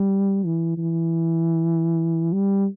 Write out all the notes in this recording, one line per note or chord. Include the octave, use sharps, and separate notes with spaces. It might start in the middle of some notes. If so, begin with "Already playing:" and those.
Already playing: G3
E3
E3
G3